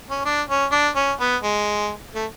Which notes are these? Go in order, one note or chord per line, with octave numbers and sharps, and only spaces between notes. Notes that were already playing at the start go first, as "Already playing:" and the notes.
C#4
D4
C#4
D4
C#4
B3
G#3
A3